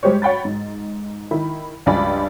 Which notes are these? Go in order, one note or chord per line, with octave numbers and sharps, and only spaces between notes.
G3 G#3 G4 C5 C#5
C#5 F#5 G5 B5 A6
G#2
D#3 E4 B5
C#2 G2 F3 D5 G#5 B5